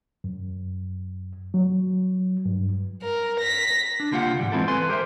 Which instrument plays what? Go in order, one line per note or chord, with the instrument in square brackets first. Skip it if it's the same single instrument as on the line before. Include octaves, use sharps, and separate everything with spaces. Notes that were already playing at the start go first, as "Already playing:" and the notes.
[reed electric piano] F#2
F#3
G2
[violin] A#4
A#6 B6
[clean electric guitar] D4
C2 D3 A#3 F4 G4 F#5
G#2 E3 G3
E3 G#3 C4 E4 A4
A4 B4 G#5 C6
G4 A#4 C5 E5